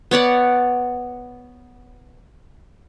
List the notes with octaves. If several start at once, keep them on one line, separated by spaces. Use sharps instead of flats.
B3 C#5 D5 F#5